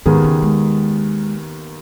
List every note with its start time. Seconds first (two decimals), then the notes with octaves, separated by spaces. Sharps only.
0.06 D#2 G#2 D#3 B3 G#4
0.24 C#3
0.43 G#3